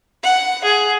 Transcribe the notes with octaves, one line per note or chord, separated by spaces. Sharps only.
F#5
G#4